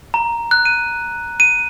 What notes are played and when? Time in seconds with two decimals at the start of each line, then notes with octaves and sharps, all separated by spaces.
0.14 A#5
0.51 F#6
0.65 D#7
1.40 D#7